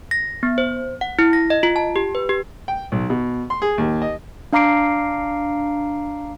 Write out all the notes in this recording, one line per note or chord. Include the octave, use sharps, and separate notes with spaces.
A#6
B3
C5
F#5
E4
A#6
D#5
F4
A5
G4
B4
G4
G5
B1
B2
C6
G#4
D#2
D#5
D4 F5 A#5 D6 C7 D7